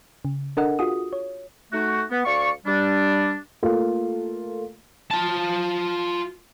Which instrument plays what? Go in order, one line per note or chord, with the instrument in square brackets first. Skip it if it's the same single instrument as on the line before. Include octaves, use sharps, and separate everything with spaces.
[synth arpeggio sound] C#3
D4 A4 A#4 D#5 F#5
F4 F#4 G#4 D#6
C#5
[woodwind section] A3 D#4 F#4
B3
D2 D5 F5 C#6
G3 D4
[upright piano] A3 A#3 F4
[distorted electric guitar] F4 A5